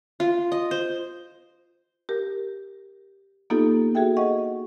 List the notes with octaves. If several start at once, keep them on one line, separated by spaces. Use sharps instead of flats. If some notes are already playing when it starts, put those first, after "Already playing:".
F4
D#5
C5
G4 A#4
A#3 B3 D#4 F4 G4 A4
F#4 G#4 A4 E5 G5
D#5 F#5 C#6